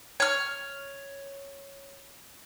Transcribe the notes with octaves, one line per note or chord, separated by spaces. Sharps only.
C#5 F6